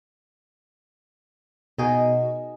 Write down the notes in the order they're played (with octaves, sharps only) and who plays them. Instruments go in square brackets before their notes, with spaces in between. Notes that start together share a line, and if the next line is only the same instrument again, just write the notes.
[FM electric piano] B2 F#4 [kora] D#4 G#4 A#4